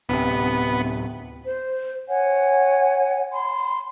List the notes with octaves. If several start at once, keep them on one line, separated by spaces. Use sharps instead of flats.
D1 C3 B3
C5
C#5 F#5 G#5
B5 C6